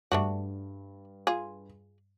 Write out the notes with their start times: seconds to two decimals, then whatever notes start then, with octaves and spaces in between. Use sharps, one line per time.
0.12 G2 A3 D4 F#4
1.27 F4 G#4